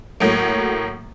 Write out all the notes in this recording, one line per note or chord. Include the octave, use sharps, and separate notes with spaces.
A2 F#3 A3 A#3